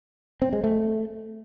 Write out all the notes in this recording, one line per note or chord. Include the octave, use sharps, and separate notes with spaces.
C4
G#3
A3